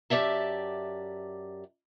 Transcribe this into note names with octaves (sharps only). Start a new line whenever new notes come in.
F#2 G4 D5 E5 A5